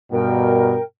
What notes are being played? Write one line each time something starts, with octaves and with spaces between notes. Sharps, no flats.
G2 B2 A#4 G5